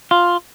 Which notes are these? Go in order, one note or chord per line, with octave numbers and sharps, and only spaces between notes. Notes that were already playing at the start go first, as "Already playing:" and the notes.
F4